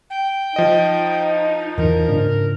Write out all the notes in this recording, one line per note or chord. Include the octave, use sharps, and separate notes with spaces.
G5
F3 D#4 D#5
E2 E3 A#4
G#2 C#3 D4